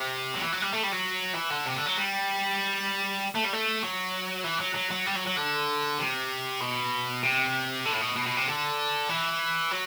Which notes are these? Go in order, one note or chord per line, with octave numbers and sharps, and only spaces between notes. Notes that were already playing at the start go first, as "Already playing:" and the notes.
Already playing: C3
F#3
E3
F#3
G3
A3
G3
F#3
E3
D3
C3
D3
F#3
G3
A3
G3
A3
F#3
E3
F#3
F#3
F#3
G3
F#3
F#3
D3
C3
B2
C3
D3
A2
B2
B2
B2
C3
D3
E3
F#3